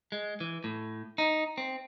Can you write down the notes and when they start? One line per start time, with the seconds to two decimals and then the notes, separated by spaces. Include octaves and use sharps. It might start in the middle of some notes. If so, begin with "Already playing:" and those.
0.12 G#3
0.40 E3
0.64 A2
1.18 D#4
1.58 C4